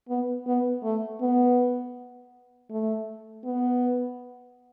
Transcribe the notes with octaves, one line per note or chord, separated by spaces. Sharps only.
B3
B3
A3
B3
A3
B3